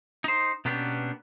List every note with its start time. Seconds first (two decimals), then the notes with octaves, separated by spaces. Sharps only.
0.24 D#4 C5
0.65 B2 A#3 B3 C#4 D4 G4